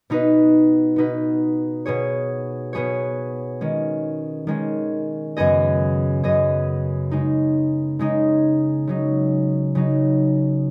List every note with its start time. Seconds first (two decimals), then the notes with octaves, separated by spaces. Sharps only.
0.10 B2 B3 D#4 B4
0.96 B2 B3 D#4 B4
1.86 B2 B3 G#4 C#5
2.73 B2 B3 G#4 C#5
3.61 D#3 G#3 C#4
4.47 D#3 G#3 C#4
5.37 F#2 C#3 B3 G#4 D#5
6.23 F#2 C#3 B3 G#4 D#5
7.11 C#3 G#3 D#4
7.99 C#3 G#3 D#4
8.87 C#3 F#3 D#4
9.75 C#3 F#3 D#4